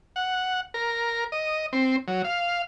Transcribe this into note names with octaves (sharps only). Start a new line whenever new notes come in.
F#5
A#4
D#5
C4
F#3
F5